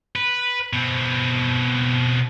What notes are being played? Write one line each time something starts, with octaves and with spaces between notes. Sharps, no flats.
B4
B2 C4